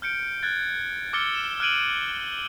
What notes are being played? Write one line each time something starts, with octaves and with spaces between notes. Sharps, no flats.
F6 G6 C#7 D7
F#6 G#6 A6
D6 E6 F6 A6 C#7 G7
E7
F6 F#6 G#6 D7 D#7 F#7